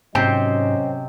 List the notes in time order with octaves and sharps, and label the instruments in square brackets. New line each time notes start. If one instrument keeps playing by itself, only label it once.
[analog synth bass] G#2 [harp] C3 [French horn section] F#3 C#4 D#5 [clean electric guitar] C5 G5